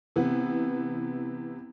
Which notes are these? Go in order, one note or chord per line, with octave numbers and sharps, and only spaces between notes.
C3 E3 B3